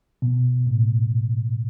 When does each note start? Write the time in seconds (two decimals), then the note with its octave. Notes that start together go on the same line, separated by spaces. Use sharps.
0.22 B2
0.67 A2